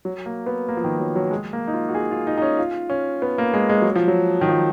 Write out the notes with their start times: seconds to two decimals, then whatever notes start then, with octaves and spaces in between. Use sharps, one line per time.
0.05 F#3
0.26 A#3
0.46 B3
0.68 A#3
0.77 F3
0.84 D#3
0.99 F#3
1.16 F#3
1.31 G#3
1.53 A#3
1.67 D#4
1.74 F4
1.89 F#4
1.95 G#4
2.11 F4
2.27 D#4
2.37 D#4
2.42 C#4
2.59 F4
2.90 C#4
3.22 B3
3.38 A#3
3.53 G#3
3.69 G#3
3.82 F#3
3.95 F3
4.08 F#3
4.41 D#3
4.48 F3